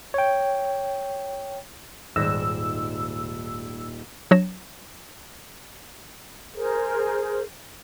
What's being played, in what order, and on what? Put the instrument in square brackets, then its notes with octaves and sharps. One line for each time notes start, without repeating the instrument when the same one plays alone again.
[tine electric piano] C#5 G5
[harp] D#1 A#6 [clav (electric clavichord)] G#2 [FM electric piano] E6
[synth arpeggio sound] F#3 D4 C#5 A#6 E7
[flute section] G#4 A#4 C5